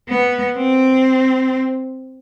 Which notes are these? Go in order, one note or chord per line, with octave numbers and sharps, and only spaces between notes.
B3
C4